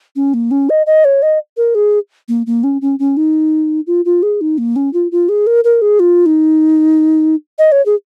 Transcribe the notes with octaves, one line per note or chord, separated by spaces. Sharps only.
C#4
A#3
C#4
D#5
D#5
C#5
D#5
A#4
G#4
A#3
A#3
C#4
C#4
C#4
D#4
F4
F4
G#4
D#4
A#3
C#4
F4
F4
G#4
A#4
A#4
G#4
F4
D#4
D#5
C#5
G#4